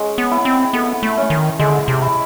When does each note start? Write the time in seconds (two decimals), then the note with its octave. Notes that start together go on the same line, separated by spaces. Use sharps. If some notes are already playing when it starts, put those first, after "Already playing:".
Already playing: G#3 C#4
0.18 B3
0.31 E4
0.45 C4
0.73 B3 A4
1.03 A3
1.17 C#4
1.30 D#3
1.59 D3 G#3
1.88 C3
2.02 E4